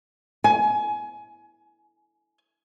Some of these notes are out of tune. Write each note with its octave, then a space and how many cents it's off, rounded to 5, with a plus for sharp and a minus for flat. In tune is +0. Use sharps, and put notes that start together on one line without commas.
G#5 +25